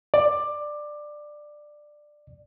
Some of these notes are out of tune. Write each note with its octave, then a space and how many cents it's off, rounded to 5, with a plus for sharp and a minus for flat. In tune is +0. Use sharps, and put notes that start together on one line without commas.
D5 +15